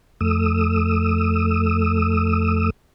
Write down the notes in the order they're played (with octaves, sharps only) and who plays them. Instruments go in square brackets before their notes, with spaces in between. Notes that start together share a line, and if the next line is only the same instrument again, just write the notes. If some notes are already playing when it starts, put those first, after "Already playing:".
[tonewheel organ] F2 A3 D#6 E6